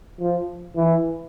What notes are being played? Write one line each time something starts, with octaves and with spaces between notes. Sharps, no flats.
F3
E3